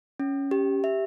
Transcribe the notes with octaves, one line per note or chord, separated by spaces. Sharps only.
C#4
G4
E5